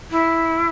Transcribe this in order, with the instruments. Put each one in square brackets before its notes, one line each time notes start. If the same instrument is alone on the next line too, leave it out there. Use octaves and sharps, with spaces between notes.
[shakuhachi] E4